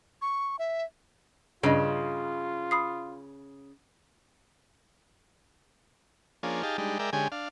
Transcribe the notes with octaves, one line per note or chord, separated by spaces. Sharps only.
C#6
E5
G2 C#3 F4 G#4 D#5
B5 D#6 C7
F3 A#3 C#4 D4 G#4
D#4 G4 G#4 F5 A5
G3 G#3 D4 D#4
G#3 A#4 D5 E5 G5
D3 G#3 C#4 G4 G#5
D4 F5